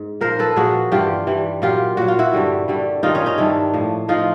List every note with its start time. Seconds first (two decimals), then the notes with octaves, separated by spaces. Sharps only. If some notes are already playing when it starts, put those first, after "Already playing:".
Already playing: G#2
0.21 A#2 F3 A#4 C5
0.39 A4 B4
0.56 A#2 F3 F#4 G#4
0.92 G2 E3 G3 F4 G4
1.27 G2 E3 G3
1.62 A#2 F#3 F4 G4
1.97 A#2 F#3 F#4
2.08 F4
2.19 E4 F#4
2.33 G2 D3 G3
2.68 G2 D3 G3
3.03 G2 D#3 G3 D#4 F4
3.15 C#4 D#4
3.26 C#4 D#4
3.38 G2 D#3 G3 D4 E4
3.74 A2 F3
4.08 A2 F3 D#4 F4